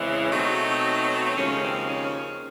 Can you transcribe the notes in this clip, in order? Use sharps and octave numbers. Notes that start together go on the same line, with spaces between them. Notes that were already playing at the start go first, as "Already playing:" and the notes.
Already playing: E2 C#3 E3 G#3 C4 E4
B2 F#3 A3 C4 D#4
D#2 C#3 F3 G#3 C#4
C4
C#4